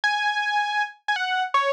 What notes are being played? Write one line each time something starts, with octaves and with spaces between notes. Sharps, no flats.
G#5
G#5
F#5
C#5